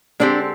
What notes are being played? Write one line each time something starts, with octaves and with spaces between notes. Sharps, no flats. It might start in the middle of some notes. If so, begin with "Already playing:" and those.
D3 G#3 C4 D4 G4